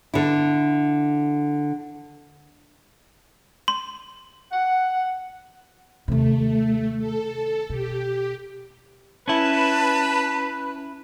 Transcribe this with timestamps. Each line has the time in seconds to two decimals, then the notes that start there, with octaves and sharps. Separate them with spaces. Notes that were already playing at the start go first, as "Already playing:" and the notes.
0.14 D3 E4
3.68 C6
4.52 F#5
6.08 D#2 C3 A3
6.98 A4
7.70 B2 G4
9.28 C#4 E4 B4 A5